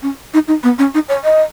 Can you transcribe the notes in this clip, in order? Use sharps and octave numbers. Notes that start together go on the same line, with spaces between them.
C#4
D#4
D#4
B3
C#4
D#4
C#5
D#5